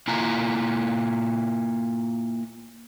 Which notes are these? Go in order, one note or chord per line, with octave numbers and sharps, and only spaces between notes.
A#3 E4 F4 G#5 A#5